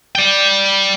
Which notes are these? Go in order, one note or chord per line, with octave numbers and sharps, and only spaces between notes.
D5 G5